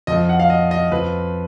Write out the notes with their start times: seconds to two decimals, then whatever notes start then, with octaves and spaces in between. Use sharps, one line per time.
0.07 F2 F3 D#5
0.29 F#5
0.40 F5
0.50 D#5
0.71 D#5
0.91 F2 F3 B4